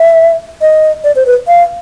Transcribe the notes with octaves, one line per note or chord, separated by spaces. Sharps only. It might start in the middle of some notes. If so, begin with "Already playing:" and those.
Already playing: E5
D#5
D5
C5
B4
F5